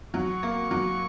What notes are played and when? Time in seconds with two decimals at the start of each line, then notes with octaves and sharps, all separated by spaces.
0.13 F#3 C#6
0.43 A#3
0.71 F#3